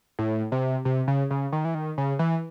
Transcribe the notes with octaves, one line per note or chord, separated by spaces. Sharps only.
A2
C3
C3
C#3
C#3
D#3
E3
D#3
C#3
E3